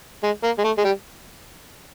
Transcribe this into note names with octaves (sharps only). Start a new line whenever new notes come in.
G#3
A#3
G#3
A3
G#3
G3